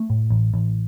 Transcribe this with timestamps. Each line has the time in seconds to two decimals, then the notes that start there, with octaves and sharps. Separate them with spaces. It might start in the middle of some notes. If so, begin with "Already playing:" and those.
Already playing: A3
0.10 A2
0.30 A1
0.54 A1